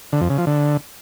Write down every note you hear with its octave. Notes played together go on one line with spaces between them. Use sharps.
D3
F2
C#3
F3
D3